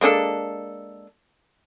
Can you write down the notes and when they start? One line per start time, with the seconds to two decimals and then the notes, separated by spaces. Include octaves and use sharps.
0.01 G#3 A#3 D4 A4